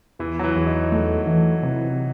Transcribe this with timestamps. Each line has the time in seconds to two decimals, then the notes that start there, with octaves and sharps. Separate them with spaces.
0.19 E2 E3
0.39 F#3
0.44 E3
0.56 E2
0.67 D#4
0.92 A3
1.27 E3
1.63 C3